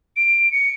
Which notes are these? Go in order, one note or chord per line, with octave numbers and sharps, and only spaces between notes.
D7
C#7